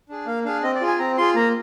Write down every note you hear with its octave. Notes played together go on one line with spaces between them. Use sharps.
D4 G#4
A#3 F5
D4 G#4 F5
C4 D#5
D5
F4 G#4
G#5
C4 A#5
F4 G#4 C6
A#3 A#5